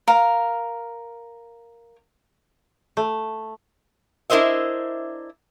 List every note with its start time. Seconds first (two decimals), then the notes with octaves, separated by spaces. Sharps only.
0.08 A#4 F5
2.97 A3
4.30 D4 E4 A#4 C5 D#5 E5